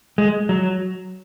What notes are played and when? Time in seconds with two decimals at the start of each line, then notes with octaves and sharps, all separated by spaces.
0.18 G#3
0.49 F#3